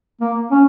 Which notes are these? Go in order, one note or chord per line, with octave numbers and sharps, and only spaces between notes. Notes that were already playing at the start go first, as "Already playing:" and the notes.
A#3
C#4